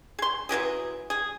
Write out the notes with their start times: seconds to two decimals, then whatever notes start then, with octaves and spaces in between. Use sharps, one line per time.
0.19 G#4 C6
0.49 E3 F#3 G4 G#4
1.10 G#4